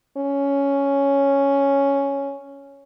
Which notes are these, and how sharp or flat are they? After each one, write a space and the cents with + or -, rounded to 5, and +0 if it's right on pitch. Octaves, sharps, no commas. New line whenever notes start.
C#4 +5